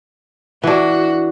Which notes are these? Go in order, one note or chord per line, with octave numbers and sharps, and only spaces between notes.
E3 D4 F#4